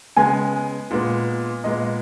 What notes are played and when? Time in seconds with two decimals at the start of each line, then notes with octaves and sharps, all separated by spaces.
0.17 C#3 G#3 B3 G#5
0.91 A#2 G#3 B3
1.64 A#2 G#3 B3 D#5